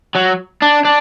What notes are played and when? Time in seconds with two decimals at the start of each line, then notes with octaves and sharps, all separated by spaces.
0.15 F#3
0.62 D4
0.85 D4